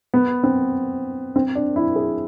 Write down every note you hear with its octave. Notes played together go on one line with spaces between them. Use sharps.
B3
C4
C4
D4
E4
G#4